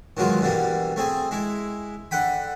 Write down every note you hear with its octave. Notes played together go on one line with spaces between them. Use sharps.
D#3 E3 F#3 G#3 F4
B2 D3 E3 G3 A#3
A3 C4 G#4
G#3 E4
D3 F#5 G5 B5